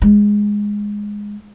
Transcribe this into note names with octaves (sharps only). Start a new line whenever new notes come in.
G#3